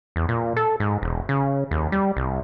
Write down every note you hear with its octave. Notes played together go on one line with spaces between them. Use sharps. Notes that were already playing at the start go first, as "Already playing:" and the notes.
E2
A#2
A4
G#2
E1
C#3
D#2
G3
C2